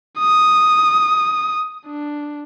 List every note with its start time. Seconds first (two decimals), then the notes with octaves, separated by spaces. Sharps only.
0.19 D#6
1.86 D4